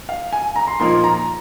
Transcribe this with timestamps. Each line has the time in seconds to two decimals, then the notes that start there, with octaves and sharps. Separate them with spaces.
0.09 F5
0.33 G#5
0.56 A#5
0.67 C6
0.80 A#2 F3 A#3 D#4 C6
1.04 A#5